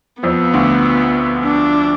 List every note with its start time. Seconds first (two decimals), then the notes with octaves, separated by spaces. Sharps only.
0.23 F2 F3 B3
0.53 D2 D3
1.46 D4